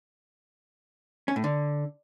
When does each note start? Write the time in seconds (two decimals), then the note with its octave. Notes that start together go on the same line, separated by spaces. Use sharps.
1.28 C#4
1.36 A2
1.44 D3